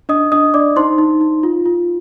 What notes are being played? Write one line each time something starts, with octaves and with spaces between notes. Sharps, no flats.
D4 D#5 D#6
D4 D#5 D#6
D4 D5 D6
D#4 C5 C6
D#4
D#4
F4
F4